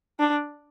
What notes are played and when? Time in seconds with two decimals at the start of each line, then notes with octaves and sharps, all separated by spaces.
0.20 D4